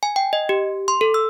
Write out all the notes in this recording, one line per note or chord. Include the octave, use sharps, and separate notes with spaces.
G#5
G5
D#5
G4
C6
A4
E6